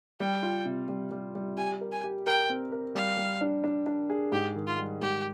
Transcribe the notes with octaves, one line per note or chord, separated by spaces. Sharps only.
G3 G5
F4
C3
G3
G3
G3
G4 G#5
A#4
G#5
G4
A#4 G5
C4
A#4
G3 F5
G3
D4
D4
D4
G#4
G#2 G4
D#3
F4
G3
G#2 G4